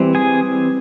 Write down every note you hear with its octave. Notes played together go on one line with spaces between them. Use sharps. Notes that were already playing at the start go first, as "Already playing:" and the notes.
Already playing: E3 G3 C4
G#4 G#5